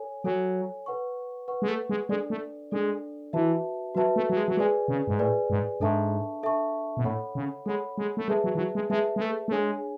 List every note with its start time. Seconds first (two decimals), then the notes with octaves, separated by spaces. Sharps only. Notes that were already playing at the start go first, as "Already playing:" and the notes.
Already playing: A4 C#5 G#5
0.24 F#3 A4 C#5 G#5
0.86 B4 F#5 C#6
1.48 B4 F#5 C#6
1.62 G#3
1.68 A3
1.90 G#3
2.09 G#3 D4 A4 D5
2.30 A3
2.71 G#3 D4 A4 D5
3.33 E3 F#4 B4 E5 A5
3.95 F#3 F#4 B4 E5 A5
4.16 A3
4.30 F#3
4.37 G#3
4.48 F#3
4.57 G#3 G#4 B4 D5 G#5
4.88 C#3
5.08 G#2
5.19 A2 G#4 B4 D5 G#5
5.50 G#2
5.80 G#2 D4 A4 E5 A5 C#6
6.43 D4 A4 E5 A5 C#6
6.97 B2
7.04 A2 A4 C#5 F#5 B5
7.35 C#3
7.66 G#3 A4 C#5 F#5 B5
7.98 G#3
8.17 A3
8.28 G#3 G#4 B4 E5 A5
8.44 F#3
8.55 E3
8.58 F#3
8.75 G#3
8.90 G#3 G#4 B4 E5 A5
9.16 G#3
9.22 A3
9.48 A3
9.52 G#3 D4 G#4 C#5 G#5